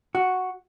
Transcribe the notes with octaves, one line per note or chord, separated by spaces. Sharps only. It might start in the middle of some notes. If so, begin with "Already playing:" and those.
F#4